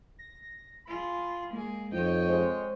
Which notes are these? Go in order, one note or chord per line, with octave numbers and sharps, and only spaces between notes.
A#6
F4 G#4 B5
G#3 A#3 G#4
F2 D#4 C#5 D#5 G5
G#3 C5